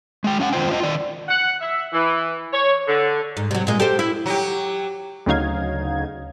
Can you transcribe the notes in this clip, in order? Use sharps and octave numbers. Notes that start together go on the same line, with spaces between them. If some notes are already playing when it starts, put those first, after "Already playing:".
G#3 G5
F#3 C#4 F5 F#5
D#3 G3 F4 C5 G5
F4 D5 D#5
D#3 D5
F#5
E5
E3
C#5
D3
G#2
C3 F#3
A#2 G#3
G4 A4 C5
E4
F#3 G4
D2 C#3 F#3 D#4 F5 G#6